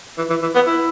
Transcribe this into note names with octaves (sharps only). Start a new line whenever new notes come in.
E3
E3
E3
B3
E4